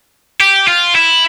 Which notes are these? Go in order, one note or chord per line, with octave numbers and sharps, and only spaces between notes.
G4
F4
E4